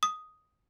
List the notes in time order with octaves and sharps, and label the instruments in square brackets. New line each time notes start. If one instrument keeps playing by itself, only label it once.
[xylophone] D#6